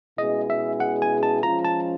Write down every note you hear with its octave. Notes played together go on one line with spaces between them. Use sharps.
B2 G#3 C#4 E4 G#4 D#5
E5
F#5
G#5
A5
F3 G#3 C#4 F4 A#5
A5